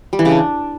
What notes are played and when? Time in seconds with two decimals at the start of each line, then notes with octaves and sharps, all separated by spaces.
0.13 G3
0.19 E3
0.25 C#3
0.31 D4